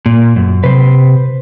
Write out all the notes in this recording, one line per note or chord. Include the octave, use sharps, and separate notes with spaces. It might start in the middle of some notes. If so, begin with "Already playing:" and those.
A#2
F#2
C3 B4 C5